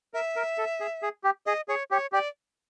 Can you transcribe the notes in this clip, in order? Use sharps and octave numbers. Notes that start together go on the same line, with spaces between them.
A#4 E5
A#4
A4
G#4
G#4
G4
G#4 D#5
G#4 C#5
G4 C#5
G4 D5